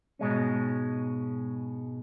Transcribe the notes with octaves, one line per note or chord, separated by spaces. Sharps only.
G#2 B2 G#3 C#4